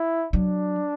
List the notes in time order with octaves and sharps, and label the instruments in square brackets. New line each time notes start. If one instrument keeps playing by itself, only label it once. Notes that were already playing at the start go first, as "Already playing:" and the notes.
Already playing: [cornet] E4
[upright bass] F#3 [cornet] D4